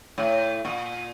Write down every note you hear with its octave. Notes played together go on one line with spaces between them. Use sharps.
A2
A#2